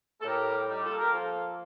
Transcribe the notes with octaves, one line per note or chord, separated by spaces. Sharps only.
A4
A2 G4 A#4
G3
G3 D#4 G4
F4 A4
A#3
G4 A#4
F3 F4 A4
A#3